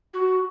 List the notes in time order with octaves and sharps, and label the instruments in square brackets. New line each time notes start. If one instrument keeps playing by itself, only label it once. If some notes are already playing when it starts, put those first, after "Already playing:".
[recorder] F#4